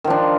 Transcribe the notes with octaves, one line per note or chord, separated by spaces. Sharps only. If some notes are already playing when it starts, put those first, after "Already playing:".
D#3 F3 D4